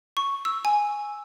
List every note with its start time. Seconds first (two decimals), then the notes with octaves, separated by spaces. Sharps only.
0.17 C#6
0.45 E6
0.65 G#5